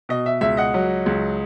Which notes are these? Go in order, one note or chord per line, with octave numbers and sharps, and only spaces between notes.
B2 D#5
E5
C#2 E5
D#5 F#5
F#3
C#2